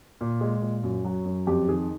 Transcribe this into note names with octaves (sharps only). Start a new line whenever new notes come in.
A#2
G#3
A#2
F#2
F#3
F#2
F2 G4
D#3 G#4